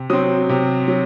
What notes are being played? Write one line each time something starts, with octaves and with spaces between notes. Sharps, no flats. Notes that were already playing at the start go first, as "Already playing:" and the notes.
Already playing: C3
F#3 C4 D#6
C3
F#3